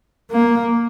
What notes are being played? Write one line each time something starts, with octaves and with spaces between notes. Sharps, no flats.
A#3